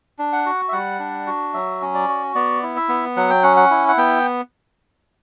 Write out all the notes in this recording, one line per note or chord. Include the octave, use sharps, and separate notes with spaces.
D4
F#5
F#4
E5
G3 F#5
D4
F#4
F#3 E5
C#4
D5
F#4
B3 D5
E4
E5
B3
F#3 F#5
G5
C#4 F#5
F#5
E4
F#5
B3 G5